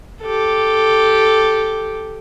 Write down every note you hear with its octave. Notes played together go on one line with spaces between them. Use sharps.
G4 A4